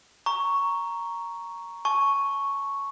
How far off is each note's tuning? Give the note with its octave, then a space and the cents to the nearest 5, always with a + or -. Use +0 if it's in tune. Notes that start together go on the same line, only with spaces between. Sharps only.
A#5 +0 C#6 +5
A5 -30 C#6 +0